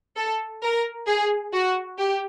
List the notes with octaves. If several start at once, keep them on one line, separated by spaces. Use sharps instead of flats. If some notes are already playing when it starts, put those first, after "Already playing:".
A4
A#4
G#4
F#4
G4